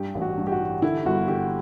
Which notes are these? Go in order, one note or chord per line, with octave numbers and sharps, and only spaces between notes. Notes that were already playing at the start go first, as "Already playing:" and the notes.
Already playing: G2 G4
A1
F#4
G2
G4
F#4
E3
D3 E4
G1 F#4
D3 G4